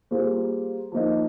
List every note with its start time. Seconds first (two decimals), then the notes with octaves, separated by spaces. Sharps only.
0.11 G3 A#3 F4 G#4 C5
0.92 F3 A#3 D#4